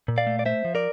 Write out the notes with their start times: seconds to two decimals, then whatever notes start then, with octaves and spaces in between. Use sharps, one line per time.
0.08 A#2
0.18 D5 F5
0.27 A3
0.39 D5
0.46 A3 C5 E5
0.65 F3
0.75 A#4 D5